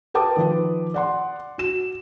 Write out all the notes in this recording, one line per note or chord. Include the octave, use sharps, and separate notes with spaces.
A#4 B4 G5 A5 D6 D#6
D#3 F3 B4
D5 F#5 C6
F#4 E7